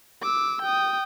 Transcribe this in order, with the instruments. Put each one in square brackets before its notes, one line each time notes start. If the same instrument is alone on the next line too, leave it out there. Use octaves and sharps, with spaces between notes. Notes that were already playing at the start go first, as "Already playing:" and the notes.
[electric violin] D6 E6
G5 D#6